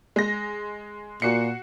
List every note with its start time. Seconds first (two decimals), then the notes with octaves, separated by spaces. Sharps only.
0.16 G#3 A#6
1.22 A#2 F#4 C7 C#7